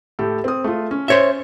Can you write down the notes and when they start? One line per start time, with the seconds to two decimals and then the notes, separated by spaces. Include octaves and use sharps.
0.19 A2 G4 A4
0.44 C4 D#6
0.64 A3 F4
0.91 C#4
1.08 C5 C#5 E5